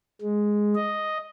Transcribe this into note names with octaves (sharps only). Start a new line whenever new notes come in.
G#3
D#5